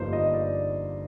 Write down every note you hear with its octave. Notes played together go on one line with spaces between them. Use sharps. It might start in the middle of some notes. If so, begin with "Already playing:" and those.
Already playing: G1 G2 F3 A#3 D#4 C5
D#5
D5